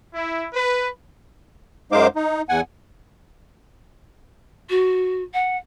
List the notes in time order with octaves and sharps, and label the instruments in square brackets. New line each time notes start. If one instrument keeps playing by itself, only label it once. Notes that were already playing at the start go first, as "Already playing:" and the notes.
[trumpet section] E4
B4
[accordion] F#2 G#3 D#4 C5 F5 D6
D#4
E2 F#5 G#5
[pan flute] F#4
F#5